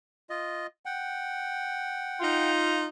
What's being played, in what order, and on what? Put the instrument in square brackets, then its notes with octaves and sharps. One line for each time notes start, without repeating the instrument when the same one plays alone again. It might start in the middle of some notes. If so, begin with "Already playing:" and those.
[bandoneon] F4 D#5
F#5 G5
[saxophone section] D#4 F4